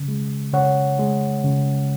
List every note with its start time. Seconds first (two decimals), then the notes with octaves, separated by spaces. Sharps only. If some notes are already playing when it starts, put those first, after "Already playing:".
Already playing: C#3
0.08 G#3
0.53 C#3 C#5 F#5
0.99 G#3
1.44 C#3